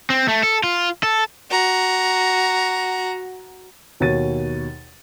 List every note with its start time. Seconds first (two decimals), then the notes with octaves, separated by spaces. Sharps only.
0.10 C4
0.28 A3
0.43 A4
0.64 F4
1.03 A4
1.50 F#4 A#5
4.00 D#2 B2 C#5 A6 D#7